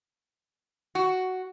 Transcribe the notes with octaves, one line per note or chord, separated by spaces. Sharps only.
F#4